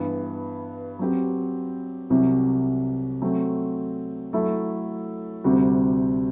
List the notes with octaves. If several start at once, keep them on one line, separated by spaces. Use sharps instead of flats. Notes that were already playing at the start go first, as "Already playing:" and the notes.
Already playing: G2 E3 B3
F#3 C4 G4
C2 C3 F#3
F#3 A3 C4
F#3 A3 E4 A4
D2 C3 G3 C4 F#4